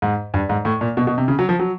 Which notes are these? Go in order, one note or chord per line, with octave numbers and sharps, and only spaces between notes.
G#2
G2
G#2
A2
A#2
B2
B2
C3
C#3
F#3
F3
F#3